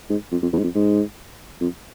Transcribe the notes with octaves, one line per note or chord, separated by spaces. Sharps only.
G#2
F2
F2
E2
G#2
F2
G#2
F2